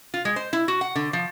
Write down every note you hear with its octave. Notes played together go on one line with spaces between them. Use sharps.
F4
G#3
C5
E4
F#4
F#5
D3
F3